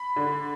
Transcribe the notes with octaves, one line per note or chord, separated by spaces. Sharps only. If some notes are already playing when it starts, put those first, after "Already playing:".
Already playing: B5
D3